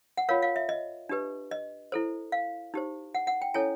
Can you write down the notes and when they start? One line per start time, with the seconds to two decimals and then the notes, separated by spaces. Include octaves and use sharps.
0.17 F#5
0.29 F4 A#4 C#5 F5
0.42 F5
0.56 E5
0.69 D#5
1.09 D4 G4 B4
1.51 D#5
1.92 E4 A4 C5
2.32 F5
2.74 D#4 G4 C5
3.15 F#5
3.27 F#5
3.42 G5
3.54 C#4 E4 A4 C#5 G#5